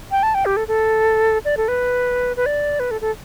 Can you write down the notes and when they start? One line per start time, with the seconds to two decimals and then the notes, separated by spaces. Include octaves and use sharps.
0.11 G5
0.23 A5
0.34 G5
0.45 G4
0.57 A4
0.68 A4
1.45 D5
1.57 A4
1.68 B4
2.37 B4
2.46 D5
2.80 B4
2.91 A4
3.01 A4